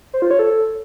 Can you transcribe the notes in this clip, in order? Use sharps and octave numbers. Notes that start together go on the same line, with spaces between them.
C5
F4
C#5
A4